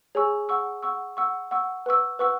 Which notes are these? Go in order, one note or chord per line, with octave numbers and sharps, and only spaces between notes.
G#4 C#5 G#5 C#6 E6
F#5 C#6 E6
F#5 C#6 E6
F#5 C#6 E6
F#5 C#6 E6
B4 F#5 C#6 E6
B4 F#5 C#6 E6